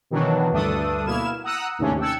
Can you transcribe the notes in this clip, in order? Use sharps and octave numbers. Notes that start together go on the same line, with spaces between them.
B2 D#3 E3 F#3 D4 F#4
D2 G2 A3 D4 A4 D#6
B2 A#3 E4 F6 G#6 E7
F#5 A#5 D#6 E6 F#6
D#2 G#2 C3 A3 C#4 D4
G5 A5 E6 F#6 G#6 C#7